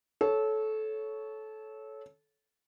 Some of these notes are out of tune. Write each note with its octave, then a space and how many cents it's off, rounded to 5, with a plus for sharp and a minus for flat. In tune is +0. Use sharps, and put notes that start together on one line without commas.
A4 -20 C#5 +0